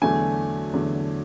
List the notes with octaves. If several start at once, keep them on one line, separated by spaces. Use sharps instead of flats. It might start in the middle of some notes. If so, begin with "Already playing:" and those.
E2 D3 F#3 A3 G#5
E2 D3 F#3 A3